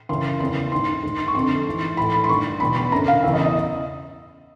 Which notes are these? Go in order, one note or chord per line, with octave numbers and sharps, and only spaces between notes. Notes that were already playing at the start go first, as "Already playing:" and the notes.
F#2 C#3 E3 C6
E2 C#3 E3 C6
G#2 D#3 C6
G#2 D#3
C#6
F2 D3 C6
G#2 E3
A2 E3 B5
B5
C6
G2 D#3 C#6
E2 B2 B5
B5
F#2 D3 A#5
F5
E2 C#3 E3 E5
D#5
D#5